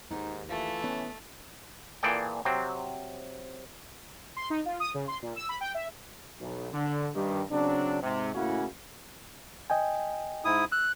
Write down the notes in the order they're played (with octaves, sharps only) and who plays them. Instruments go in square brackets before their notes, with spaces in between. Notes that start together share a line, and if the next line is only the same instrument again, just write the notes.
[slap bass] D#2 [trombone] G#2 [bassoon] D#4
[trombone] E3 [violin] A3 [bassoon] F4
[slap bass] B3 [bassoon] C#4
[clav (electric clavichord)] A#2 E3 G#4 A4 D5 G5
C3 F#3 C4
[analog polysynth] C6
D#4
F4
D#6
C#3
C6
A#2
E6
B5
G5
E5
[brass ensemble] B1
D3
G2 D#3 G4
C#3 F#3 C4 D4
G#2 C3
A2 C#3 A#3 C#4 E4 F#4
[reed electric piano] D#5 G5 G#5
[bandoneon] G#2 E4 D#6
[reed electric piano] E6 [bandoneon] F#6